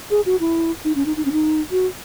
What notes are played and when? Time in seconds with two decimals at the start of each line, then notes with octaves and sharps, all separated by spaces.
0.11 G#4
0.26 F#4
0.40 E4
0.85 D#4
0.96 C#4
1.06 D#4
1.17 D#4
1.25 C#4
1.32 D#4
1.71 F#4